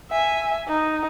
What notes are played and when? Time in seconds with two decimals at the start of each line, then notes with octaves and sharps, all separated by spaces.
0.11 E5 G#5
0.68 D#4